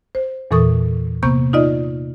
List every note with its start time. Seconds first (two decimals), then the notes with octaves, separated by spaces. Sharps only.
0.15 C5
0.51 E2 A#2 E3 A4 C#6 D#6
1.23 C3 A#3 B3 C#6 G6
1.53 D#4 F4 D5 D#5